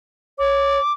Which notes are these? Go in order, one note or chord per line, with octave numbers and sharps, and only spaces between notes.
C#5 D6